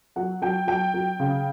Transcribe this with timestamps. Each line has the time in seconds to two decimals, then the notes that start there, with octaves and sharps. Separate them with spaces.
0.16 F#3 F#5
0.42 F#3 G5
0.67 F#3 G5
0.94 F#3
1.19 C#3